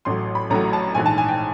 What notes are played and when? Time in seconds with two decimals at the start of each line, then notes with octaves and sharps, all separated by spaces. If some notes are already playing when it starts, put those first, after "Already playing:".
0.05 A1 A2 F#3 C6
0.35 B5
0.50 A1 A2 F#3 A#5
0.73 A5
0.95 A#1 G#2 E3 G#5
1.06 A5
1.18 G#5
1.28 G5